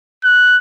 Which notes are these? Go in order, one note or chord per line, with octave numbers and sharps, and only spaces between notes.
F#6